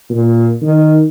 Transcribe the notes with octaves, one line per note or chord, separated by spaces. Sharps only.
A#2
D#3